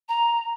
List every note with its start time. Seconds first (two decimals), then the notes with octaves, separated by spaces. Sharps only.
0.09 A#5